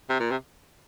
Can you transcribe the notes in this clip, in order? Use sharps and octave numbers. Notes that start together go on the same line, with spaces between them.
C3
A#2
C3